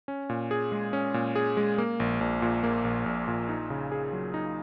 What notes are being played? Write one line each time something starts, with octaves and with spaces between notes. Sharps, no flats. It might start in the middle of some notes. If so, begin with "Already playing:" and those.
C#4
A#2
G#4
G#3
C#4
A#2
G#4
G#3
A#3
A#1
A#1
A#2
A#3
A#1
A#1
A#2
D#4
C#3
G#4
F#3
D#4